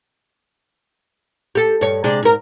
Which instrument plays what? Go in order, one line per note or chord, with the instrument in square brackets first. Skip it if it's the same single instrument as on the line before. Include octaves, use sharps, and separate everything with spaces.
[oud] G4 A4
G2 C#5
C3 G#3 D4
G#2 A#4